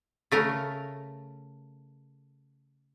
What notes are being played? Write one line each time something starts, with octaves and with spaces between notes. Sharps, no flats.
C#3 A3 A#4